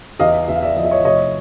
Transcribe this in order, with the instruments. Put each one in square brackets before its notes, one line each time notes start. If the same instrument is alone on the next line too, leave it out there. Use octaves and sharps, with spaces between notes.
[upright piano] E2 D#5 F5
E2 E5
F5
D5 E5
F3 D#5
E5
C#5 D#5
F1 C#5 D#5